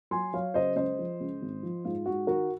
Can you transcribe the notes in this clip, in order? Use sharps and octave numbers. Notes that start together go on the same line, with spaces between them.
F#3 G#5 C6
F#3 C#5 F5
C#3 C5 D#5
C#2 C5 D#5
F3
C#2
G#1
F3
G#2 F4
G#2 F#4
D#3 F#4 A#4